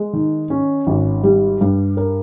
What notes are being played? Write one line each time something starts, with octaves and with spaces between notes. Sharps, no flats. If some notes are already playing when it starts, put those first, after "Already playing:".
Already playing: G#3
D#3
C#4
G#1
G3
G2
A#4